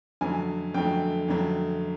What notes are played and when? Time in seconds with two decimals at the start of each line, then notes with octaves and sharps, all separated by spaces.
0.21 F2 D3 F#3 A3 G#5
0.74 F2 D3 F#3 A3 G5
1.28 F2 D3 F#3 A3